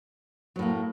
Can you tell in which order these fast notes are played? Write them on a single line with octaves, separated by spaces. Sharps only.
F#3 A2 A#3